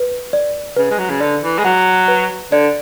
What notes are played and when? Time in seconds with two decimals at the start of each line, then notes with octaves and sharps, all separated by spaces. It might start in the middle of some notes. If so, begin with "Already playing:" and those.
Already playing: B4
0.33 D5
0.76 C#3 B4
0.90 G#3
0.98 F#3
1.10 C#3
1.20 D3 D5
1.43 E3
1.58 G#3
1.64 F#3 F#5
2.08 B4
2.52 D3 D5